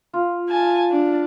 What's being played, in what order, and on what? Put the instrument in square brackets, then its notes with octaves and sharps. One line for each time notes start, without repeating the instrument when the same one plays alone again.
[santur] F4
[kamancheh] G#5 A5
D4